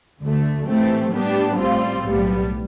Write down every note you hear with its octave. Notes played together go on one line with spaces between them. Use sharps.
D2 D3 A3
A2 E3 A3 C4 G4
A2 G3 B3 D4 G4
A1 A2 G3 C4 F4
B1 A2 G3 B3